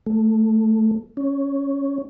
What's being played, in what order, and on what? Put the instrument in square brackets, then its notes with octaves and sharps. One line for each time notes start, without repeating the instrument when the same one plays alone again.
[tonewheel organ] A3
C#4